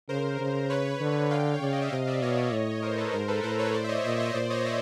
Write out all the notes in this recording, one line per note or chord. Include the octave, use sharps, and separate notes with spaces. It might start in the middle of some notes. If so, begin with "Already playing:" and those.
C#3 A#4 C5
C#3
B4 C#5
D3
F5 G5
C#5
C#3 D5
D#5
E5
C3 D#5 F5
D5 E5
B2 C#5 D#5
A2
A#4 C5
C5
A4 B4
G#2 A#4 C5
A4 B4
A2 A#4 C5
B4 C#5
C5 D5
E5
C#5 D#5
A#2 D5 E5
C#5 D#5
A#2 C5 D5
C#5 D#5
D5 E5